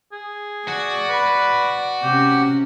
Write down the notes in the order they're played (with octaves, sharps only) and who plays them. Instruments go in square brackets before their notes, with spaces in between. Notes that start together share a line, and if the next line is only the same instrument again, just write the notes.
[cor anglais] G#4
[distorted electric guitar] F#4 [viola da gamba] D5
[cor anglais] B4
[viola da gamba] C3 C#4 [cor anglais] G4